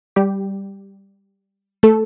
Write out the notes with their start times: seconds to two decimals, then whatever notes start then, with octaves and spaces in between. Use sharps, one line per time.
0.16 G3 G4
1.83 A3 A4